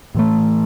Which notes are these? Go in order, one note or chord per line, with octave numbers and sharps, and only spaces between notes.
A2 E3 A3